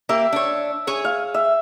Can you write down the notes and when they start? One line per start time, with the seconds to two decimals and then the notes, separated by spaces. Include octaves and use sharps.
0.09 A#3 G4 E5
0.33 D4 C#5
0.87 G#4 C#5
1.05 F5
1.34 E5